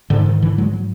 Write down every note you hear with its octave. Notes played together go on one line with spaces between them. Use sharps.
G#2 D3
D#3
D3 E3
F#3 G#3
F#3